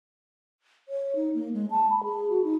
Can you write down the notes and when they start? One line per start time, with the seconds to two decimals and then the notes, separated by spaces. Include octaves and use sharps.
0.89 C#5
1.16 D#4
1.34 A#3
1.54 G#3
1.70 A5
1.90 B5
2.04 G#4
2.30 F#4
2.44 D#4